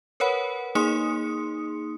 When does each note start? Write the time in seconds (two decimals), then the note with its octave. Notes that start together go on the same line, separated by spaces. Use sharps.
0.20 A#4 B4 C#5 F#5 B5
0.75 A#3 D#4 G#4 C6 D#6 C#7